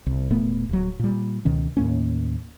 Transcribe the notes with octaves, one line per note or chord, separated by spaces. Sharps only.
C2
E1 A#2 A3 B3
D1 F#3
A#2 G3
C#2 B2 D#3 C#4
D#2 A2 A#3 C#4